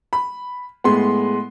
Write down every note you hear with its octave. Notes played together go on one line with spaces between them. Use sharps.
B5
A2 G#3 B3 C6